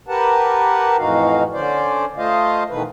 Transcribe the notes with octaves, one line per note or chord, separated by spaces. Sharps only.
G4 A#4 B4 F#5 A5
F2 A2 E3 D#4 F#4 F5
D3 C#4 C5 D5
A3 F4 C5 D#5 F5
B2 D#3 E3 A3 B4